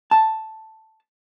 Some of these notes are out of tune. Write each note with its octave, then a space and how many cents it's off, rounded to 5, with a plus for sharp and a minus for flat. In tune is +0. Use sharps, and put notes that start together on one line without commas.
A5 +0